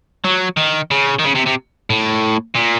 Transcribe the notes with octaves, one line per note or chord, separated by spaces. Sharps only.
F#3
D#3
C#3
D#3
C#3
C3
C3
A2
A#2